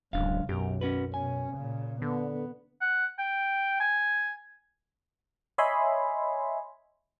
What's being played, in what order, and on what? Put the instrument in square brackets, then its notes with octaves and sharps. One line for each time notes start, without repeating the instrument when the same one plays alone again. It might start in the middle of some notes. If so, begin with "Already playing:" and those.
[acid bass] D1 [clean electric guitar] C#2 D4 F5 [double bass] F#2
[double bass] B1 [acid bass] F#2 [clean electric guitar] G4 A#4
[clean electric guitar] C#4 F#4 B4
[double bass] B2 C#4 [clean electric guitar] G#5
[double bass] A#2 C#3
[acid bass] D3 [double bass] B3
[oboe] F#5
G5
G#5
[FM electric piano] C#5 D#5 E5 G#5 B5 C6